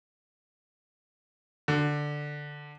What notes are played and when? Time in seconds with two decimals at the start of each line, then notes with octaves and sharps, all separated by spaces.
1.68 D3